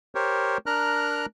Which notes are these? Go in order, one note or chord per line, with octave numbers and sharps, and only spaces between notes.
G4 A#4 C5 C#5
D4 A#4 A#5 F6 F#6